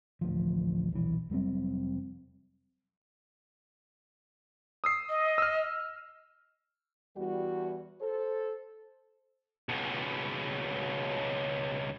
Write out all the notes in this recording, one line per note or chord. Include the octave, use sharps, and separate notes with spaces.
A1 D2 F3
D#1 B1 C3 E3
F1 F#3 G3 C4
D#6 E6 C7
D#5
E6 F6
E2 G3 F#4
A4 C5
C#2 B2